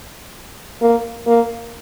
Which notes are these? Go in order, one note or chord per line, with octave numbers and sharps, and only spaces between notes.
A#3
A#3